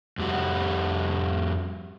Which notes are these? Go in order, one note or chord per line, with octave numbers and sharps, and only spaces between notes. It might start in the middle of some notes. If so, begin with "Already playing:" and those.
F2 G3 F#4